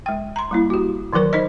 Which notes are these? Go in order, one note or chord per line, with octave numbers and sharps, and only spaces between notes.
G#3 G5
A#5 C6
G3 A#3 E4
F#4 G4
D#3 E3 F#3 A#4 C#6
D#4 C5 D#5